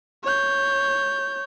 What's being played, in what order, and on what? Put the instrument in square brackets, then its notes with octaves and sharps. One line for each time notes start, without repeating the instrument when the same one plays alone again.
[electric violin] C#5 G6